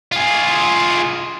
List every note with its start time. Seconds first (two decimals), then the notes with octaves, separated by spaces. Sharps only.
0.12 F4 G#4